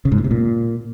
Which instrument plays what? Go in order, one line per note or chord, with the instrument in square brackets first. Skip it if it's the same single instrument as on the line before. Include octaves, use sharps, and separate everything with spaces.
[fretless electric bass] C#3
G#2
A#2
C3
A#2